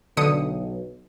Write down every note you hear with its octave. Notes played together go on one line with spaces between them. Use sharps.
B1 D3 D#6 C#7